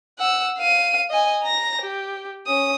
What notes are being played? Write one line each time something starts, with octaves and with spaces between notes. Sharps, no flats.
F#5 E6
F5 D#7
D#5 G#5
A#5 A#6
G4
C#4 D#6